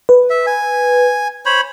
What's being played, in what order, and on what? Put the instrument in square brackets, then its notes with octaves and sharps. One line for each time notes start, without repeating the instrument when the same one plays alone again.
[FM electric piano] B4
[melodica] E5
G#5
C5 C#5 B5